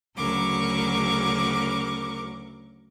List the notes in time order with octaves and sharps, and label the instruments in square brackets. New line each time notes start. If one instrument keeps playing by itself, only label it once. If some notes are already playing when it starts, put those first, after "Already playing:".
[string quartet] D2 C#3 F#3 A#4 C#6 D6